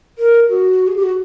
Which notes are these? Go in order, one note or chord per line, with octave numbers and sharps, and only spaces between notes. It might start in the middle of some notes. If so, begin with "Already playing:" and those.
A#4
F#4
G#4
G4
F#4